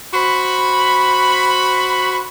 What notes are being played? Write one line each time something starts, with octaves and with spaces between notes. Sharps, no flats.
F#4 C5 B5